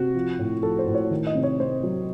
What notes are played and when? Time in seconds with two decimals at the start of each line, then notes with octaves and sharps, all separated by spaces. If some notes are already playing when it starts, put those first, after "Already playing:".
Already playing: C3 F#4
0.15 F3
0.39 A2
0.63 F3 A4
0.79 C5
0.87 A2
0.95 C#5
1.11 D#3
1.27 D#5
1.35 C3
1.43 C#5
1.60 C3 C5
1.83 F#3